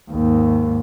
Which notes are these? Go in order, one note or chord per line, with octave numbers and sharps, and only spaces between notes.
D#2 G#2